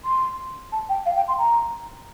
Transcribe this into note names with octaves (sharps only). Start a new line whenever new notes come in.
C6
A5
G5
F5
G5
C6
A#5